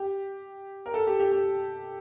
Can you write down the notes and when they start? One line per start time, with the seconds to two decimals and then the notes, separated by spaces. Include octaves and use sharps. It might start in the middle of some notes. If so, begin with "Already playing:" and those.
Already playing: G4
0.86 A#4
0.94 A4
1.07 G4
1.19 G4
1.32 G4